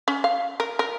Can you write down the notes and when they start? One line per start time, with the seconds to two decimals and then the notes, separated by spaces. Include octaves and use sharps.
0.08 C#4
0.24 F5
0.60 A#4
0.79 A#4